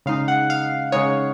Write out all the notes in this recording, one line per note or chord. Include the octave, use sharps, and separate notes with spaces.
C#3 G#3 D#4 F5
F#5
F5
C#3 G#3 D#4 C#5